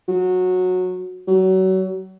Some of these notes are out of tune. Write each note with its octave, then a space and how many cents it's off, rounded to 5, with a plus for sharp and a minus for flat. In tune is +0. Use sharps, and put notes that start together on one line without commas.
F#3 -15
F#3 +30